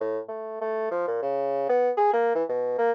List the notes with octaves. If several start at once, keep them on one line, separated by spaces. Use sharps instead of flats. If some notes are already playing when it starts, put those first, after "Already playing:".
A2
A3
A3
F3
A#2
C#3
B3
G#4
A#3
E3
B2
A#3